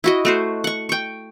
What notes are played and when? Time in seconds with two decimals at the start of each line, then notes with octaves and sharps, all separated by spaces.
0.04 E4 F#4 D#5
0.25 A3 F#4 C5
0.64 F#5 C#6
0.89 G5 C#6